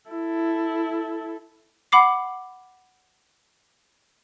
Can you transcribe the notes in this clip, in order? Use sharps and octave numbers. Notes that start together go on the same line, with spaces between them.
E4 A4
F#5 B5 D6 C7